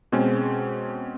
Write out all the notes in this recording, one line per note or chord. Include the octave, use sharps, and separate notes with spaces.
B2 G#3 C4 C#4